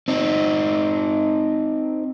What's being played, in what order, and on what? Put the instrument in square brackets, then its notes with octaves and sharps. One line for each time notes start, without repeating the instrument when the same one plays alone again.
[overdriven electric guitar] C4 D#4